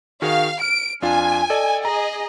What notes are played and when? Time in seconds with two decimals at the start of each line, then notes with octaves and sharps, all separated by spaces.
0.22 D#3 F#4 G#4 F5
0.61 F6 D7
1.02 F2 D4 F4 G#5
1.50 A4 D5 D#5
1.85 G#4 D#5 A#5